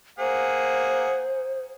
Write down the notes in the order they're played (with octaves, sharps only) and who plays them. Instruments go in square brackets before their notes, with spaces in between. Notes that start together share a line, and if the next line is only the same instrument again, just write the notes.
[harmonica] A#3 G#4 F#5 [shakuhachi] C5